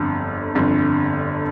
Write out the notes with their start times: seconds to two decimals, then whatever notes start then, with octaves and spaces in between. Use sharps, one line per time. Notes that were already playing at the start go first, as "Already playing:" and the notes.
Already playing: G1 F2 D3
0.55 G1 F2 D3